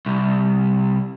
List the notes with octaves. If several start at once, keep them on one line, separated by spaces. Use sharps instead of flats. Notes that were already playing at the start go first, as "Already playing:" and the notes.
C2